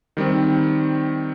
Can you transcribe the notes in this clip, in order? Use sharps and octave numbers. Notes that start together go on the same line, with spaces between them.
D#3 G3 C4